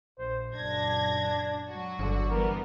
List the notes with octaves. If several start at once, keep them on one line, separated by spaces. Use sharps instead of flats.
A#1 C5
F#1 A#2 D4 G#6 A#6
F#3 F#4
G1 D3
E3 G3 B3 A#4